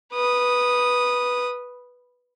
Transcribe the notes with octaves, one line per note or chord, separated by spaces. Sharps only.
B4 D#6